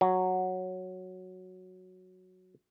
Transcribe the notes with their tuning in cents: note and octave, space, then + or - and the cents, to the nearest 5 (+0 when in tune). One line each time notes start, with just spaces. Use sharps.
F#3 -5